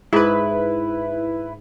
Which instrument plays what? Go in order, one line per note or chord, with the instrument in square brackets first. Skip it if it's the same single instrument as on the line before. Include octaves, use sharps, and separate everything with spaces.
[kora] G#2 [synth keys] E4 B4